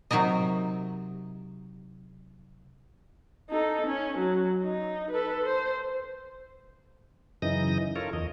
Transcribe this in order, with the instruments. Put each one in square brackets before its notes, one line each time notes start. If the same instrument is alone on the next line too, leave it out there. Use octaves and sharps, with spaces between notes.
[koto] C3 F#3 D#4 A#4 D#5
[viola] D#4 A4
C#4
F#3
D#4
A4 B4
C5
[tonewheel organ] F#2 C#3 E3 D#4 D#6 A#6
F4 A4 A#4 C#5
E2 D#5